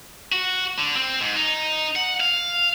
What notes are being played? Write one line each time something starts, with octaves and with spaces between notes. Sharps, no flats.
F#4
D3
C4
G#2
D#4
F#5
F5